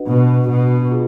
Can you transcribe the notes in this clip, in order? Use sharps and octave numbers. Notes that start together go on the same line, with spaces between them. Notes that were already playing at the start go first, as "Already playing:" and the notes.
Already playing: D4 F#4 B4 D#5 F#5
B2
B2
F4 G#4